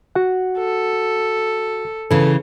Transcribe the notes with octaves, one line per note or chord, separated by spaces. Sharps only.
F#4 F#5
A4
C#3 E3 A4